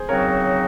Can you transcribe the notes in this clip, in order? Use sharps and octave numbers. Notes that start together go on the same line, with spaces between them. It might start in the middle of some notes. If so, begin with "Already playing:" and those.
Already playing: G#4 C5
C#3 F#3 C4 D#4 F#4 A#4 C#5